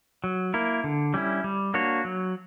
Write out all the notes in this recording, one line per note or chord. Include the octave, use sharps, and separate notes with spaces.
F#3
A#3 E4 A#4
D3
G3 C#4 E4
G3
A#3 D4 F#4 C#5
F#3